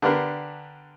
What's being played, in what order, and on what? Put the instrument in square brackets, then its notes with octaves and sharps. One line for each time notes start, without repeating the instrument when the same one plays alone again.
[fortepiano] D3 B3 D4 G4 A#4 B4